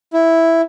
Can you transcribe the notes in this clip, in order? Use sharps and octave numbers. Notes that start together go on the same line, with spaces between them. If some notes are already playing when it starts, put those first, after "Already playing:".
E4